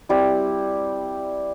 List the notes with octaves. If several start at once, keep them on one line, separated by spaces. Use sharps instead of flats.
G3 C4 E4